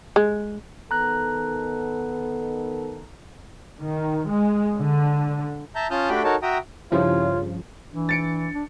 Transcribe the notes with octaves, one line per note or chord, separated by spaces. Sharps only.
G#3
D#3 B3 A4 A#5 F#6
D#3
G#3
D3
E5 A5 A#5 G6
C#4 F4 A5 D#6 F6 G6
A3 D4 F#4 G4 G5 B5
D#4 F#4 A4 A#4 C#5 A5
F#4 E5 G5 A#5 D#6
G2 C#3 F3 E4 F4 G4 C#5
E3 D4
A6 C#7 D7
D4